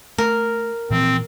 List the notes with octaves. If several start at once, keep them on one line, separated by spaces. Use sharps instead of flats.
A3 A#4
A#2 E3 F3 C4